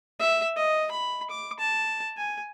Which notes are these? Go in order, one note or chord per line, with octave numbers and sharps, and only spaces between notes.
E5
D#5
B5
D6
A5
G#5